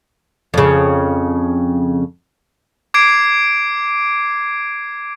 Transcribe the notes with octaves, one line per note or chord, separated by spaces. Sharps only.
F2 C#3
D6 G#6 C7 D7